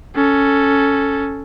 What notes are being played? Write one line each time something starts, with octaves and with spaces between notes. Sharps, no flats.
C#4 A4